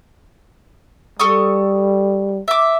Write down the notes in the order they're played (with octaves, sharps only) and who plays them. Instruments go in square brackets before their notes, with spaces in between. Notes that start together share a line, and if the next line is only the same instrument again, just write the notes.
[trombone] G3 [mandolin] A4 C#6 D#6
[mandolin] E5 D6